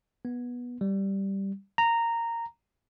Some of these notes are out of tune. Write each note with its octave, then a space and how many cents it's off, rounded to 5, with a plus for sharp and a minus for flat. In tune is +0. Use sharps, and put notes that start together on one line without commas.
B3 -15
G3 -5
A#5 -10